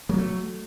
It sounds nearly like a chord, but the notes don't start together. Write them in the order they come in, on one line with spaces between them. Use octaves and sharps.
F#3 A#3 A3